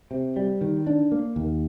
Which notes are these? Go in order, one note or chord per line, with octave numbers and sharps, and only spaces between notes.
C3
G3
D#3
D4
A#3
D#2